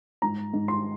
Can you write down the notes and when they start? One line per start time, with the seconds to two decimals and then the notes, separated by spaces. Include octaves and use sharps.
0.22 G#2 A#5
0.53 G#2
0.68 C6